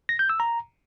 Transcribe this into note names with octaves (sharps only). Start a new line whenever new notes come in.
A#6
G6
E6
A#5